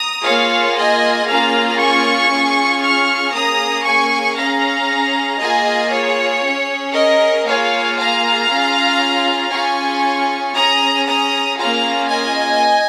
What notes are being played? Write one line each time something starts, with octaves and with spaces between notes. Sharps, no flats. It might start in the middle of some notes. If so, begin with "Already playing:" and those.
Already playing: A#5 D#6
A#3 F4 G#4 C#5 F5
D#5 G#5
A#3 C#4 F4 G#4 F5 A#5
G#5 C#6
C#4 F4 G#4
C#6 F6
A#3 C#4 G#4 A#5 D#6
G#5 C#6
C#4 G#4 F5 A#5
A#3 F4 G#4 D#5 G#5
C#5
C#4 G#4
A#4 D#5
A#3 F4 G#4 C#5 F5
F5 A#5
C#4 F4 G#4
C#4 F4 G#4 G#5 C#6
C#4 G#4 A#5 D#6
A#5 D#6
A#3 C#4 F4 G#4 F5 A#5
D#5 G#5